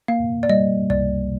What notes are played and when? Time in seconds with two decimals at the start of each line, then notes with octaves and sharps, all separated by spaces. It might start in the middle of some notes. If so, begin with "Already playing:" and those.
0.08 A#3 F5
0.43 D5
0.49 G3 D#5
0.90 C2 D5